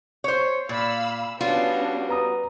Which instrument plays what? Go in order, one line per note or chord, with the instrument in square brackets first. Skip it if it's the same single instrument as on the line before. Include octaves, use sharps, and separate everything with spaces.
[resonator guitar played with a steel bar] C5 C#5
[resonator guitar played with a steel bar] A#2 [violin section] F5 B5 E6
[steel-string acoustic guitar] G3 F#4 [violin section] B3 C#4 D4 [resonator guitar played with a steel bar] F4
[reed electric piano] B4 A#5 D#6